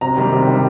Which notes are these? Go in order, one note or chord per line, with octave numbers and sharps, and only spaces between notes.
C3 A#5
D#3 G3 A#3
C3
D#3 G3 A#3